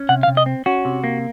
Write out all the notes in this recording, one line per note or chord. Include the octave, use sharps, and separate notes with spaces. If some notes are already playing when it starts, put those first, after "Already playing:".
Already playing: C#4
C3 F#5
F5
C3
D#5
C4
C#4 F#4
C3
A#3